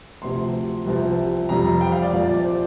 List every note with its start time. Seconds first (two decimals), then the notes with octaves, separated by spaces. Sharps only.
0.22 D2 C3 F3 C6
0.86 C2 C3 F3
1.49 F2 C3 G3 A#5
1.81 G5
1.92 F5
2.02 D5
2.13 C2 A#2 F3 D5
2.29 D5
2.45 C5